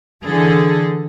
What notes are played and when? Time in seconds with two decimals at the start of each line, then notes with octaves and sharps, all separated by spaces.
0.24 D3 E3 G#4 A4